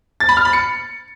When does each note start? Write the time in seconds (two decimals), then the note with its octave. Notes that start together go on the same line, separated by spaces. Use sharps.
0.20 A6
0.29 B5
0.37 F6
0.45 B5
0.53 C#7